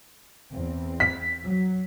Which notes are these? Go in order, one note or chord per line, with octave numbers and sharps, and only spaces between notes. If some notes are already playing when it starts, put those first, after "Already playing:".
E2 C4
B6
F#3